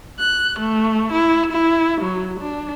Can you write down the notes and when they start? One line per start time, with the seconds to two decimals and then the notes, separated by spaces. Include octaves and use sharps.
0.20 F#6
0.59 A3
1.13 E4
1.51 E4
2.01 F#3
2.39 D4